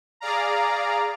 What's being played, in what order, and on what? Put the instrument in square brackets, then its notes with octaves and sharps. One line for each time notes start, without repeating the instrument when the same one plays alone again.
[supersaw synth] G#4 D5 F5 A#5